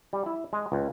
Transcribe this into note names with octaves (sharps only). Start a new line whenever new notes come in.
G3
E4
G#3
C#2